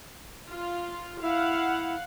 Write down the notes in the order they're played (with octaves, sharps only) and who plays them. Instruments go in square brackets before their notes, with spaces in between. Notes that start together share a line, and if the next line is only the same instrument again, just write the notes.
[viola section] F4
[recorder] E4 [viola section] F5 F#5